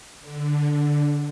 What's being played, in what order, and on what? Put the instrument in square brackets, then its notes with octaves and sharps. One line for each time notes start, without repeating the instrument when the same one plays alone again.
[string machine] D3